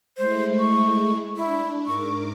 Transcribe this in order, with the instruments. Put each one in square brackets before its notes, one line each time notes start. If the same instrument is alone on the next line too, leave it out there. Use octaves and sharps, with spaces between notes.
[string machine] G#3 A3 E4 [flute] C5
[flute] C#6
[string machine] D4 [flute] E4
[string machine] G#2 A#4 D6 [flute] C#6